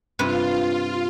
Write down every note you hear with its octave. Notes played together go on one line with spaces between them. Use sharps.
G2 C3 F4 B4